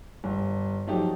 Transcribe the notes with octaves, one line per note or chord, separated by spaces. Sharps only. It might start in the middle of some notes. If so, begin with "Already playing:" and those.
G1
F3 F#3 A3 D#4 G4